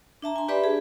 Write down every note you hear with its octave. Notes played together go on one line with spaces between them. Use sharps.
D4 E5 A5 A#5
G#5 C6
D4 G4 B4 D5 E5 B5
G#4 A5